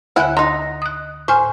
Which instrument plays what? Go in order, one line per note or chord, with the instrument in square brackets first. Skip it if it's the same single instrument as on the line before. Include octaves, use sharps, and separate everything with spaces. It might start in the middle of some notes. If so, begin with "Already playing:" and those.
[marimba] D2 D3 F#6 [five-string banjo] E4 F#5 G#5
[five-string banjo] D#4 A#5 [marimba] C6
[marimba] D#6 F#6
[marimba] A2 G#5 F6 [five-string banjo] C5